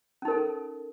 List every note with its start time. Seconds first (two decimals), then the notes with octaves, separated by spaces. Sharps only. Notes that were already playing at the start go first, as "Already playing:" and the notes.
0.22 C#4
0.25 D#4
0.28 A#4
0.31 A4